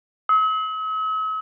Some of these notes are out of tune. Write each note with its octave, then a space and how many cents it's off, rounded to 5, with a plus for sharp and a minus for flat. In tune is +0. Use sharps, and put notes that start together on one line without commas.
E6 -45